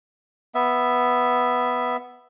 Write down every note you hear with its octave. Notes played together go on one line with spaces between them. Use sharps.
B3 E5